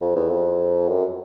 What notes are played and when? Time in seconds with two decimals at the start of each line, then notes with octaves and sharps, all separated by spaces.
0.01 F2
0.15 E2
0.30 F2
0.89 F#2